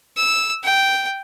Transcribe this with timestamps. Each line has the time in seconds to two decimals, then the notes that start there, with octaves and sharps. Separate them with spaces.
0.17 E6
0.64 G5